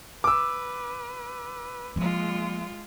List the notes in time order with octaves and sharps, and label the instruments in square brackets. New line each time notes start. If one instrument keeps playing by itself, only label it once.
[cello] B4 [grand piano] D6 E6
[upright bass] F3 A#3 [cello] G#3 F4